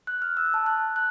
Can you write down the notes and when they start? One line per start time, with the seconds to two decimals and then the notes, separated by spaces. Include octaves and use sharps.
0.07 F#6
0.22 F6
0.37 E6
0.54 A5
0.66 F#6
0.96 F#6